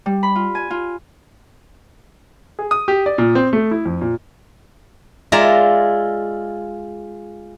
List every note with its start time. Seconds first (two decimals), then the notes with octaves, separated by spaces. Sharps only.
0.06 G3
0.23 B5
0.35 F4
0.55 G#5
0.70 F4
2.59 G#4
2.71 D#6
2.88 G4
3.06 D5
3.18 A#2
3.35 C4
3.53 A3
3.71 E4
3.86 F2
4.01 A#2
5.32 G#3 F4 D5 E5 A#5